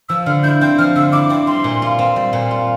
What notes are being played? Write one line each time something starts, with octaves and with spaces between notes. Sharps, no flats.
F3 E6
D3 F6
E4 G6
C4 G6
F3 F6
D3 E6
E4 D6
C4 D6
G3 C6
A#2
F4
C4
G3
A#2
F4